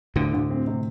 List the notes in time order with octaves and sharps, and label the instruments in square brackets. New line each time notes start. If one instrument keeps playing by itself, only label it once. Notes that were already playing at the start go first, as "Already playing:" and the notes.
[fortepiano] D2 [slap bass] A2 D3
[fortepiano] D2
C4
C3